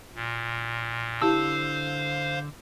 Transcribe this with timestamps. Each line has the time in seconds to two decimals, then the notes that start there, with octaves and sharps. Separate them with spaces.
0.15 A#2
1.21 D3 E4 G4 C5 F5 A5 E6